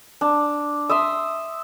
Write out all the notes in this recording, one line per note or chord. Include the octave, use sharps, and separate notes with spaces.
D4
E5 C6 D#6 E6